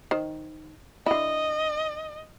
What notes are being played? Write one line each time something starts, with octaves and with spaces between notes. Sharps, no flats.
D#3 C5
D3 E4 D#5